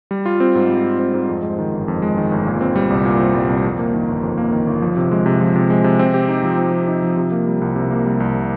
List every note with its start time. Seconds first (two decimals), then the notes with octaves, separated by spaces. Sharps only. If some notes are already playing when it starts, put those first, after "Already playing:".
0.11 G3
0.26 F4
0.40 C4
0.55 G#2
0.70 G3
0.85 F4
1.00 C4
1.14 G#2
1.29 F2
1.43 G#3
1.59 D#3
1.73 G1
1.88 F2
2.02 G#3
2.17 D#3
2.32 G1
2.46 A#2
2.61 C4
2.76 G3
2.90 C2
3.05 A#2
3.20 C4
3.34 G3
3.49 C2
3.64 F2
3.79 A#3
3.94 D#3
4.09 G1
4.23 F2
4.38 A#3
4.52 D#3
4.67 G1
4.82 F3
4.97 C3
5.11 G#3
5.26 C3
5.41 F3
5.56 C3
5.70 G#3
5.84 C3
5.99 C4
6.14 G4
6.28 D#4
6.43 F3
6.58 C4
6.72 G4
6.88 D#4
7.02 F3
7.17 C3
7.32 A#3
7.47 G3
7.61 C2
7.76 C3
7.91 A#3
8.05 G3
8.20 C2